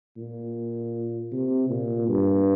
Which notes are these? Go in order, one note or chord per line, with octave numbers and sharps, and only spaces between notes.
A#2
C3
A#2
G2